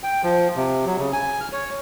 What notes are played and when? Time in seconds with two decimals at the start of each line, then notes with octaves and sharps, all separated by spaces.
0.03 G5
0.23 F3
0.56 C3
0.86 F#3
0.99 C#3
1.13 G#5
1.41 F6
1.52 C#5